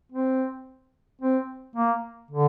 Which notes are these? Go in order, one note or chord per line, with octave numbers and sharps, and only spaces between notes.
C4
C4
A#3
D3